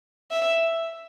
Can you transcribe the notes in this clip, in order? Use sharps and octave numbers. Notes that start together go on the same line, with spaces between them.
E5